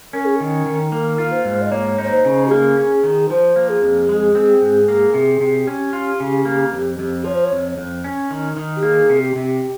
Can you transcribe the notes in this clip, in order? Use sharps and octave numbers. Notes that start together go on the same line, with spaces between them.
C#4 A#4
G#4
D#3 A#4
D#3
A#3 A#4
F4
C5
G#2
D#5
A#3 C#5
D#4 C#5
C5
C#3
G4
A#3 G#4
C#4
D#3
F3 C5
A#3
G#4
F2
G#3
C4
G#2
A#3
C3
C3
C#4 G4
F4
C#3
A#3
F2
F2
F3 C#5
C5
C#5
F2
F2
C#4
D#3
D#3
G4
A#3 G#4
C3
G4
C3